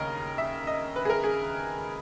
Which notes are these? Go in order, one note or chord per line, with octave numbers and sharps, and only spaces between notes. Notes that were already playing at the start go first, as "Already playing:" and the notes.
Already playing: D#2 C#3 A#4 D#5
E5
D#5
B4
G#4
A#4
G#4